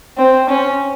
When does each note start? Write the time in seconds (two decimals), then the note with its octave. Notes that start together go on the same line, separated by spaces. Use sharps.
0.18 C4
0.50 C#4